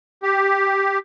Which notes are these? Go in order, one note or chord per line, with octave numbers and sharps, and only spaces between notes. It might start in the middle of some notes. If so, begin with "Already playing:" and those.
G4